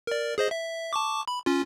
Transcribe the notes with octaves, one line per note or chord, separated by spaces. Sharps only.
A#4 D5
G#4 C5 D#5
E5
A5 C#6 D6
B5
C#4 F4